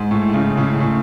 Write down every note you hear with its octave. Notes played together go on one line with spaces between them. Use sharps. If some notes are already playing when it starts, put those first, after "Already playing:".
Already playing: G#2
A2
A2 C#3
A2 C#3
A2